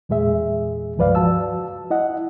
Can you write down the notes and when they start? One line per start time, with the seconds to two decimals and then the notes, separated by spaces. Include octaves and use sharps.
0.09 E2 A#2 G#3 G#4 E5
0.97 C#2 G2 F3 B4 D5 F5
1.15 F#4 A5 E6
1.90 E4 D#5 F#5